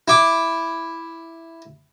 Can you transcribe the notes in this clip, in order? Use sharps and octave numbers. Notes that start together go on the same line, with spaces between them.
E4 D6